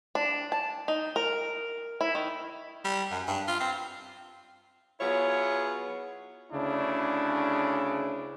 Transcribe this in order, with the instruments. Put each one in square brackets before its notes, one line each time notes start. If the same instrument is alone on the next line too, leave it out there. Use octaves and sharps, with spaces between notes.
[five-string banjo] D4
A5
D#4
A#4
E4
D#3
[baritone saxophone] G3
F#2
G2
F4
C4
[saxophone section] F#3 B3 E4 F4 G#4 C#5
[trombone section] D2 C#3 D4 E4